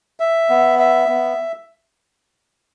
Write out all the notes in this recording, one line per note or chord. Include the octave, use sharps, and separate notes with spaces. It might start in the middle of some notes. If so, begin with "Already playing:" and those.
E5
B3
E5
B3